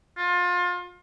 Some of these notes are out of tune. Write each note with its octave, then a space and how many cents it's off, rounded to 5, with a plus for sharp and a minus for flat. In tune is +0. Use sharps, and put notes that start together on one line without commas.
F4 +30